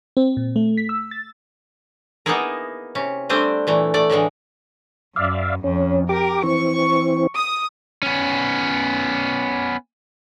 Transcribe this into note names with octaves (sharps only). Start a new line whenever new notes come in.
C4
A#2
A3
B6
E6
A6
A#3 B3 D#4 E4 G#4 A#4
C3 C#4
G3 A3 C4 D4 C5 G#5
A#2 E3 A3
A3 D5
A2 D3 E3 G#3
F#2 D5 E5 F5
F2 C#4
G4 A#4 D6
E3 C4 C#6
D#6
B3 C#4